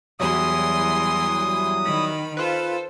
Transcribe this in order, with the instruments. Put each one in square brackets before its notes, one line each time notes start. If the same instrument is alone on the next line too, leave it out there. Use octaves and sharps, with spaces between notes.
[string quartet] E2 G#5 C6 [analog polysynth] F#3 G3 E4 [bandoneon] D#6
[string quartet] D#3 B5
[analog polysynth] F4 B4 [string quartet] A4 C5